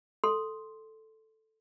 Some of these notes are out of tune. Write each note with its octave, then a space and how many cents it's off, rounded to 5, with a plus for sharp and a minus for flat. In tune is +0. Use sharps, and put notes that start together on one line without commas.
A4 +0 C6 +0